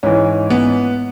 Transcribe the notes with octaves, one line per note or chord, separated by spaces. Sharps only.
G#2 E3 C#4
B3